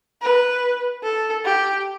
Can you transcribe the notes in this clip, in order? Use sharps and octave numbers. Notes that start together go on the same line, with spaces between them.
B4
A4
G4